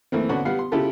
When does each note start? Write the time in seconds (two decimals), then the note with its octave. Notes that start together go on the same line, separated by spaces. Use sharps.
0.12 E3 A3 A#3 C4
0.29 D3 B3 C#4 D4 F#4
0.45 G3 B3 F5
0.59 C6
0.72 C#3 E4 F4 G4 A4